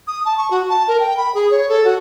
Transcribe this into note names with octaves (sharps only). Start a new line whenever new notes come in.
D#6
A5
C#6
F#4
A5
A#4
G5
B5
G#4
C#5
A4
F#4